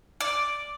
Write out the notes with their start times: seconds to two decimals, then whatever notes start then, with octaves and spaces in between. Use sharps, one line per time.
0.20 D5